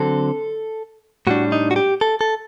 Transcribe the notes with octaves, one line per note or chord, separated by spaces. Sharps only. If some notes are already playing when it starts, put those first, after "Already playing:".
Already playing: D3 F#3 C4 A4
A2 G3 D4 F#4
D#4
F#4
G4
A4
A4